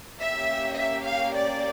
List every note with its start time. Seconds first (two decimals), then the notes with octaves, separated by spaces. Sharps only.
0.19 A#3 C#4 G4 E5
0.77 E5
1.05 F5
1.34 D5